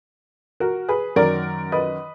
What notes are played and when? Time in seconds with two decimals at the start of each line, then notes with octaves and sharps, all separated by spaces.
0.60 F#4 A#4
0.88 G#4 B4
1.16 F#2 D#3 F#3 A#4 D5
1.72 B4 D#5